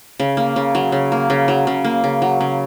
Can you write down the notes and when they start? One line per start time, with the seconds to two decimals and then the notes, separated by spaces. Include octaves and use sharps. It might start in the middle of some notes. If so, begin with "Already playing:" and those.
0.20 C#3
0.37 A#3
0.56 C#3
0.75 F#3
0.92 C#3
1.12 A#3
1.30 C#3
1.48 F#3
1.67 C#3
1.84 A#3
2.04 C#3
2.22 F#3
2.41 C#3